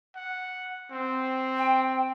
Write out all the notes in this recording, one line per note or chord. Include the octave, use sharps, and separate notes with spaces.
F#5
C4
G5